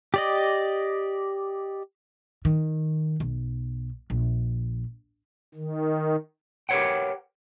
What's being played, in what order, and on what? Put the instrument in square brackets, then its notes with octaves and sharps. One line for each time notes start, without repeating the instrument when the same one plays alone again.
[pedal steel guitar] G4 D5 D#5
[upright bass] D#3
B1
A#1
[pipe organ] D#3
[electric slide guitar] G4 A#4 B4 C#5 F#5 G5